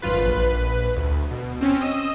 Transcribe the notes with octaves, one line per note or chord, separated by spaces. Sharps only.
G#1 F#2 F4 B4
A#1 B4
D2
B2
C4 C#4
D#5 D#6 E6